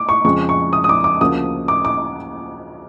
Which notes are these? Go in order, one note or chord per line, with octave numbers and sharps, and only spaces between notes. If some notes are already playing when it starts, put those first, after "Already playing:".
Already playing: D6
C#6
F2 C#3 F3 G#3 C#6
C#6
D#6
D#6
D6
D6
D2 C#3 F3 A#3 D#6
D6
D6